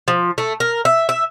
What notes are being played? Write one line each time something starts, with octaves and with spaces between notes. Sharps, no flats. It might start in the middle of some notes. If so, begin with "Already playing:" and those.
F3
A3
A#4
E5
E5